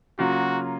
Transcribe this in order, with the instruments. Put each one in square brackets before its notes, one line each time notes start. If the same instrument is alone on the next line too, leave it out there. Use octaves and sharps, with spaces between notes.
[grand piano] C#3 F#3 A#3 F4 [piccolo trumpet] F#4